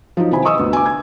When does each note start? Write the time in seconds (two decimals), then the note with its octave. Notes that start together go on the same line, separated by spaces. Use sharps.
0.17 F3 F#3 D#4
0.32 C3 D#3 E3 C4 G#5 B5
0.45 D#5 C#6 D#6 E6
0.58 D2 B3
0.73 G#5 D6
0.86 G#6